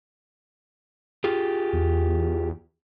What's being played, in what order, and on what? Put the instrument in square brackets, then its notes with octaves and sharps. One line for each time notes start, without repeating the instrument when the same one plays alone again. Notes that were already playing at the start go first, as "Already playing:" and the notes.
[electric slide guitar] F4 G4 G#4
[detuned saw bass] E2